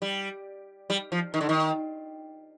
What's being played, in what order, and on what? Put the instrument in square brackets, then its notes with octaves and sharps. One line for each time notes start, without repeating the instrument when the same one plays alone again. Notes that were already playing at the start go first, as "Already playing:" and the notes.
[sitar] G3
G3
F3
D#3
D3
D#3